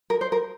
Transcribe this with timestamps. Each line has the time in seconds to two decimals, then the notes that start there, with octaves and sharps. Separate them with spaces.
0.10 A#4
0.21 C5
0.32 A#4